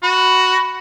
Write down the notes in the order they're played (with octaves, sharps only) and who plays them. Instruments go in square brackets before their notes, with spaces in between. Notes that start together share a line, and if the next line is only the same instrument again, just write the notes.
[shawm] F#4 [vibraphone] B5